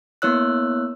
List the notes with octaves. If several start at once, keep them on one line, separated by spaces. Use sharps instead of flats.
A#3 B3 E4 C#5 E6 F#6